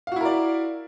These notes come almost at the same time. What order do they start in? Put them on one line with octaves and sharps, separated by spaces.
F5 F#4 E4 A#4 D5